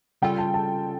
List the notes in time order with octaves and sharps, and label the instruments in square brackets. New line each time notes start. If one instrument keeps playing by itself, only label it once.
[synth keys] C#3 G3 C#4 F4 A4 [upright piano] G5
[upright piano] A5
A5